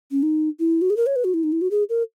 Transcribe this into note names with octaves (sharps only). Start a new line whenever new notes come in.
C#4
D#4
E4
F#4
G#4
A#4
C#5
B4
F#4
E4
D#4
E4
F#4
G#4
A#4